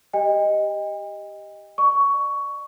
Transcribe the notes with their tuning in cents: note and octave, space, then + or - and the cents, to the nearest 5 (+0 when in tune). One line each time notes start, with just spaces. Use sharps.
G4 +0 D#5 +0 G5 +45
D5 +30 C#6 +15